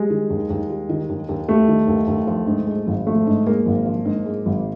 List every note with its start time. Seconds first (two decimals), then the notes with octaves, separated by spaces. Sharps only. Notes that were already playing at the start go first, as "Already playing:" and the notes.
Already playing: G3 G#3
0.10 D#3
0.30 D#2
0.50 D#2
0.70 G3
0.89 D#3
1.09 D#2
1.29 D#2
1.49 G3 A3
1.68 D#3
1.88 D#2
2.08 D#2
2.27 F3
2.47 G#2
2.67 G#3
2.87 G#1
3.07 F3 A3
3.27 G#2
3.46 G#3 A#3
3.66 G#1
3.86 F3
4.05 G#2
4.26 G#3
4.46 G#1